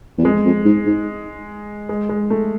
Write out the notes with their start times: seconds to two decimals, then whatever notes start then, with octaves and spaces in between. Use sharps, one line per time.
0.18 E2
0.24 F2 G#3
0.45 F2
0.65 G#2
0.86 G#2
1.89 G#3
2.09 G#3
2.30 A3